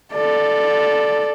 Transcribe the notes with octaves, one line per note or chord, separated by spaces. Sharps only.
A4 D5